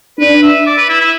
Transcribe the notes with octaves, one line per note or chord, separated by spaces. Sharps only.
D4 B4
E5
D5
B4
E4
E4